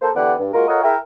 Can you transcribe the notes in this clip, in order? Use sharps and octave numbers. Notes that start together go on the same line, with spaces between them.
A#3 A4 C5
D3 E3 B3 G4 D5 F#5
G2
G#3 A#3 F4 F#4 A#4
F4 A4 A#4 C#5 D#5 F#5
E4 G#4 A#4 E5 G5